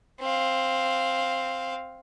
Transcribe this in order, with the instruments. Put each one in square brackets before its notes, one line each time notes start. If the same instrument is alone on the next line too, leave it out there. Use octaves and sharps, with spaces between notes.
[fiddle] C4 F5